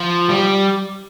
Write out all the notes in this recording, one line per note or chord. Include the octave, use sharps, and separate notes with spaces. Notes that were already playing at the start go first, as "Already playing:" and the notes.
Already playing: F3
G3